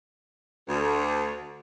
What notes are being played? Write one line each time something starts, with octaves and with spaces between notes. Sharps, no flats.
D2